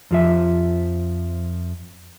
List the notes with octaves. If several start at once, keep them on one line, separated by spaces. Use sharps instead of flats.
F2 F3 E5